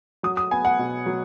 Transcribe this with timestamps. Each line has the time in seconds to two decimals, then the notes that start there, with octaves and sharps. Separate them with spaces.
0.23 F#3 D#6
0.37 D#6
0.51 B3 G#5
0.65 F#5
0.79 B2
1.06 F#3